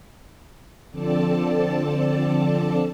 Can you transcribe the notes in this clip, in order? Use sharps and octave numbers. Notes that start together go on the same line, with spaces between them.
D3 F3 C4 A4 D5 A5